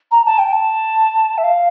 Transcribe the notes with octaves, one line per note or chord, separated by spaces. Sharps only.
A#5
A5
G5
A5
E5
F5